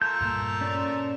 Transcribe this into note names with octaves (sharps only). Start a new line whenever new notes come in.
A3 F4 A#4 G6
G2 A#2
C#4 D5